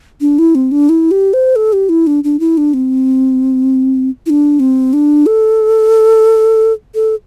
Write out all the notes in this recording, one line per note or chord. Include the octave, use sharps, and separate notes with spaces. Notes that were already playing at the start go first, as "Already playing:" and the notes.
D4
E4
C4
D4
E4
G4
C5
A4
G4
E4
D4
D4
E4
D4
C4
E4
D4
C4
D4
A4
A4